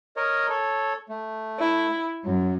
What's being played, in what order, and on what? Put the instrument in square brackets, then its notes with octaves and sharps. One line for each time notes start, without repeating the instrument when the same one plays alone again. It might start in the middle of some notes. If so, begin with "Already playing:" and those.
[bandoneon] A#4 C#5 D#5
A4 C#5
A3
[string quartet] E4
[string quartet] F#2 [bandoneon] F#3